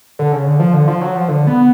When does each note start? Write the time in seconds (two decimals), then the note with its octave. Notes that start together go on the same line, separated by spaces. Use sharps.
0.19 D3
0.32 C#3
0.46 D3
0.60 F3
0.74 D3
0.88 F3
1.01 F#3
1.15 F3
1.28 D3
1.47 B3